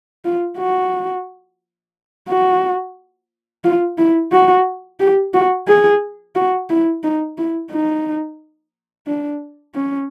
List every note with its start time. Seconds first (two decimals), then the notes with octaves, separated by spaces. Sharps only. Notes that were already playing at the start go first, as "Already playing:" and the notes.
0.25 F4
0.58 F#4
2.28 F#4
3.64 F4
3.98 E4
4.32 F#4
5.00 G4
5.34 F#4
5.68 G#4
6.36 F#4
6.70 E4
7.04 D#4
7.37 E4
7.72 D#4
9.07 D4
9.75 C#4